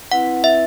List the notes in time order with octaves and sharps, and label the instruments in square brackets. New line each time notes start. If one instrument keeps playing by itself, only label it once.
[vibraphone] C4 E4 B4 [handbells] F#5
[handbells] E5